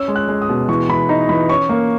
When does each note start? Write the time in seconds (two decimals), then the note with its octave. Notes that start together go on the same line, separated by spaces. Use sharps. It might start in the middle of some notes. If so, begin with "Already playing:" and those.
Already playing: C#4 E6
0.08 G#3
0.16 F#6
0.29 G#3
0.42 D#6
0.49 B2
0.69 E3 C#6
0.89 E3 B5
1.09 D#4 A#5
1.29 E3 B5
1.49 C#4 C#6
1.69 A#3